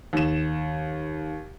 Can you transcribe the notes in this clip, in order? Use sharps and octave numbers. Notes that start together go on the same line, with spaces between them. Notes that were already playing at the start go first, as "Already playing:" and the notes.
D#2 E7